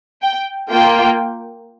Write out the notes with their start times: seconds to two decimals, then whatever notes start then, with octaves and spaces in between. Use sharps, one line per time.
0.22 G5
0.69 A#3 F4 G5